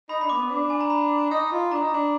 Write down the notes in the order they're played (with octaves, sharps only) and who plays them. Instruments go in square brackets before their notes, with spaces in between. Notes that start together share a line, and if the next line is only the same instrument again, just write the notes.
[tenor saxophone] D#4 [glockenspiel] B5
[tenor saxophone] D4 [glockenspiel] B5
[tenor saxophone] A#3 [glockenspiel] D6
[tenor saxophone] B3
D4
[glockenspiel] G#5
A#5
B5
[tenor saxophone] D#4
F4
[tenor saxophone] D4 [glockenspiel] A#5
[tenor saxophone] D#4
D4